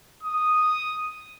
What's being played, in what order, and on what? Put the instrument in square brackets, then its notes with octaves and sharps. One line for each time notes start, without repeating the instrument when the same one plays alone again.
[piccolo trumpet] D#6